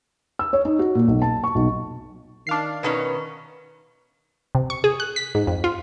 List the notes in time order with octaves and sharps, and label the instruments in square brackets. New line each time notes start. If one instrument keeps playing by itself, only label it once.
[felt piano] E6
C#5
D#4
F#4
A#2
B1
A5
C#6
B1
[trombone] D#3 [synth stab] D4 F5 C7
[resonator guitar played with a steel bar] B2 D#3 C#4 [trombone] B4
[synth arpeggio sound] C3
C#6
G#4
F#6
B6
G#2
F2
F4